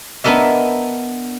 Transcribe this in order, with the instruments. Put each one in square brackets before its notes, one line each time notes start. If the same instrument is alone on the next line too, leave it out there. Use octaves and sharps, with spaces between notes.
[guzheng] B3 D4 A#4 D#5 E5